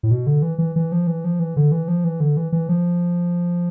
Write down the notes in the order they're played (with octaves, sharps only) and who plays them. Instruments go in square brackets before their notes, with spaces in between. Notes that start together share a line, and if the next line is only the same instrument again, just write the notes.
[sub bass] A2
B2
D3
E3
E3
E3
F3
E3
F3
E3
D3
E3
F3
E3
D3
E3
E3
F3